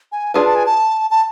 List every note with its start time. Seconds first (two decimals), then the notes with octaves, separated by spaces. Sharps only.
0.12 G#5
0.34 D4 F4 G#4 B4 A5
0.46 A5
0.55 G#5
0.66 A5
1.11 A5